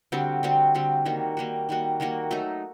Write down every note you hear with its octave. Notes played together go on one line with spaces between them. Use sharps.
D3 G3 C4 F#4
D3 G3 C4 F#4
D3 G3 C4 F#4
D#3 G3 A#3 F#4
D#3 G3 A#3 F#4
D#3 G3 A#3 F#4
D#3 G3 A#3 F#4
F#3 A3 D#4